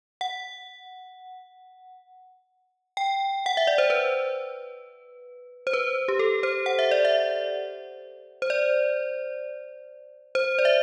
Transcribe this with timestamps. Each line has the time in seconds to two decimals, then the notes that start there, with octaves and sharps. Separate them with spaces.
0.21 F#5
2.97 G5
3.46 F#5
3.57 E5
3.67 D5
3.78 C5
3.90 B4
5.67 C5
5.73 B4
6.08 G4
6.19 A4
6.43 C5
6.66 F#5
6.79 E5
6.91 D5
7.05 E5
8.42 C5
8.50 D5
10.35 C5
10.58 D5
10.65 E5